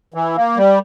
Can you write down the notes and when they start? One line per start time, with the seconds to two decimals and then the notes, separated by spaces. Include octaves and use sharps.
0.14 E3
0.36 A#3
0.57 G3